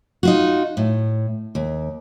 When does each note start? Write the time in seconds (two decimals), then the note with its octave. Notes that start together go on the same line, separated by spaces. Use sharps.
0.23 D#4 F4 F#4
0.77 A2
1.55 D#2